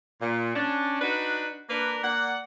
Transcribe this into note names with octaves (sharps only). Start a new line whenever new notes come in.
A#2
C#4 D4
D4 D#4 F#4 B4
A#3 D4 A#4 B4
A#3 D5 F#5